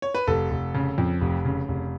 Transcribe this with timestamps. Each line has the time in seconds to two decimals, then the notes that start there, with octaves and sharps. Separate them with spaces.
0.02 C#5
0.15 B4
0.27 F1 A4
0.51 F1
0.74 C#3
0.98 F2
1.21 F1
1.45 C#3
1.68 F1